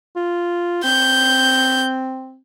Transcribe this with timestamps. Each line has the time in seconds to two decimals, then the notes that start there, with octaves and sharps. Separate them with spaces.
0.16 F4
0.84 C4 G6